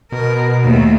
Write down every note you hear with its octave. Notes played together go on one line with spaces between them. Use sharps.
B2 A#4
D#2 A3